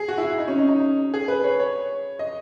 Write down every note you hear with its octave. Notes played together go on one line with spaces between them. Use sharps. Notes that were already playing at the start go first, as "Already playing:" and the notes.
Already playing: G#4
F#4
E4
F#4
D#4
C#4
D#4
D#4
G#4
B4
C#5
C#5
D#5